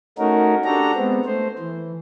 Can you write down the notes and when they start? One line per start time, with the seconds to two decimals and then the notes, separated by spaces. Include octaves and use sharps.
0.18 A3 C#4 D#4 F#4 A#4
0.65 D4 F#4 G4 A4 A#5
0.96 G#3 B3 C4
1.26 A3 C5
1.59 E3